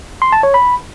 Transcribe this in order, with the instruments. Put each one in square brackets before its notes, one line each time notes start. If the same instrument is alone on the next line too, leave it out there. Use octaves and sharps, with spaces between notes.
[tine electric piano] C6
A5
C#5
B5